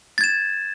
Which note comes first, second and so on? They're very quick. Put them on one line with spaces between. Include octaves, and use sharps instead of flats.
A6 G#6 E7